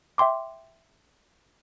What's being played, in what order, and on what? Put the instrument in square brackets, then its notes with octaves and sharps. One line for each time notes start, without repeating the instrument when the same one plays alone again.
[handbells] E5 G5 C6 D6